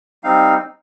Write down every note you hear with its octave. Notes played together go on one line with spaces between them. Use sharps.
G3 C4 D#4 F5